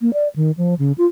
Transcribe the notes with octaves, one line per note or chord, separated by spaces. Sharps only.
A#3
D5
D#3
F3
C#3
F4